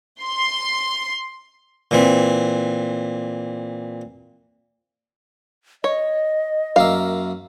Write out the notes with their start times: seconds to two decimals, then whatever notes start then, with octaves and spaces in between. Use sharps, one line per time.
0.23 C6
1.91 A#2 E3 C4
5.84 C#5 D#5
6.76 F#2 A#3 E5 F5